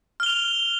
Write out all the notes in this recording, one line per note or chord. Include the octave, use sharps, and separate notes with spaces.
F6 F7 G7